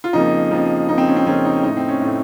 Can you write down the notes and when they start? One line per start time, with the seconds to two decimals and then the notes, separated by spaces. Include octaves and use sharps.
0.04 F4
0.13 F2 C#3 F3 A#3 D#4
0.51 F2 C#3 F3 A#3
0.89 F2 C#3 F3 A#3 D#4
0.98 C4
1.08 C#4
1.16 C4
1.26 F2 C#3 F3 A#3 C#4
1.45 D#4
1.63 A2 A3 D#4
1.77 C4
1.89 C#4
2.01 A2 A3